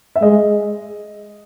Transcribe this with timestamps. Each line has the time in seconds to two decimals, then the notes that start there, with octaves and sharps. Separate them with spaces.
0.16 E5
0.22 G#3 D#5